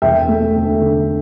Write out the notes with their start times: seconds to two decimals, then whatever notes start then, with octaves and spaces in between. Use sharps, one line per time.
0.02 E1 E5 G5
0.28 A3
0.56 D2
0.81 D3